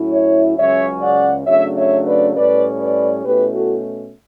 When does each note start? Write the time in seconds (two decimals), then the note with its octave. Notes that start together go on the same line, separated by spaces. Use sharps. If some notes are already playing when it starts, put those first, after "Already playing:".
Already playing: A2 F#3 C#4 E4
0.12 C#5 E5
0.57 C#2 C#3 F#3 C#4 C#5 E5
1.02 D5 F#5
1.46 C#3 F#3 A3 D4 C#5 E5
1.76 C#5 E5
2.06 B4 D5
2.35 A2 G3 C#4 B4 D5
2.80 B4 D5
3.24 B2 A3 C#4 E4 G4 B4
3.54 F#4 A4